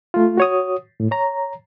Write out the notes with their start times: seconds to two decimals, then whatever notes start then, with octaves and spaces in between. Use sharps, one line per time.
0.14 A3 F4
0.38 F#4 C#5 D#6
1.00 A2
1.11 C#5 A#5